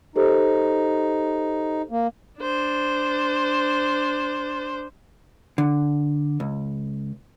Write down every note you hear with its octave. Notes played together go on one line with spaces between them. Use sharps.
D#4 G4 A4 C5
A#3
D4 C5
D3
C#2